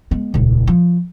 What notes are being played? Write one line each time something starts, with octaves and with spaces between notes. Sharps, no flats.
G#3 B3
D#1 C#2
F3